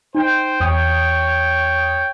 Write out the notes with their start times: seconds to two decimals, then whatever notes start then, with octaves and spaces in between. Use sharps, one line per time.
0.15 D#4 C5 G5
0.60 E2 C#5 G5 D#6